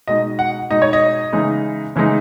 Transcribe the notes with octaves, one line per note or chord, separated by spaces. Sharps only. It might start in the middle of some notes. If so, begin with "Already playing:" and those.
B2 G#3 D#4 D#5
F#5
B2 G#3 D#4 D#5
C#5
D#5
C#3 E3 G#3 D#4
C#3 E3 G#3 D#4